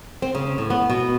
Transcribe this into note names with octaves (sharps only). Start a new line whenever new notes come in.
C4
C#3
A2
B3
B2